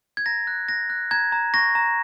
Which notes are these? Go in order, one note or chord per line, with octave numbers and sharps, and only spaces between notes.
G#6
A#5 A#6
F#6
F#6 A#6
F#6
A#5 G#6
A#5
C#6 A#6
A#5